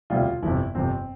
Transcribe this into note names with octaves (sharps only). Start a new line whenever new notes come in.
E1 D2 C3 G3 F4
G1 F2 C3 E4
G1 F2 C3 C4